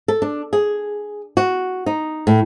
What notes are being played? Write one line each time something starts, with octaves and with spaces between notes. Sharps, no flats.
A4
D4
G#4
F#4
D#4
A2